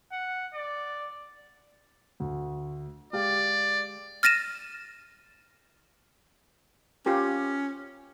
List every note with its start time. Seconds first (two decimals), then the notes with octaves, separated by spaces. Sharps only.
0.12 F#5
0.54 D5
2.20 D2
3.13 G#3 G4 D5 F5
4.23 F6 A6 A#6 D#7 E7
7.06 C#4 F4 G4 A#4